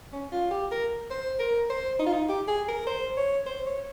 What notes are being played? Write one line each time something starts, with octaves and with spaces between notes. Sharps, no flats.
C#4
F4
G4
A#4
C5
A#4
C5
D#4
F4
D#4
G4
G#4
A#4
C5
C#5
C5
C#5